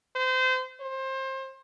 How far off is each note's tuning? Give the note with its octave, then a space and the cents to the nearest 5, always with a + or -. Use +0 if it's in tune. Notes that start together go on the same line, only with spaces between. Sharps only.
C5 -30
C5 +25